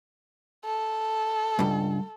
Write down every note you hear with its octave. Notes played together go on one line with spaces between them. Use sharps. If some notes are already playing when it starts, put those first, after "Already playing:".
A4
C#2 G2